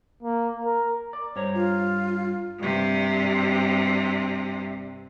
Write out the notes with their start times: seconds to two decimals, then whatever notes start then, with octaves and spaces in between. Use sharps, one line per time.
0.23 A#3
0.64 A#4
1.13 D5
1.36 G2 C5 C#5 A#5
1.54 F4
2.58 G2 C3